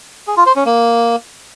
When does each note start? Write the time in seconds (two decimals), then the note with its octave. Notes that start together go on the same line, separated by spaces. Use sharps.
0.27 G#4
0.37 F4
0.46 C5
0.56 C#4
0.65 A#3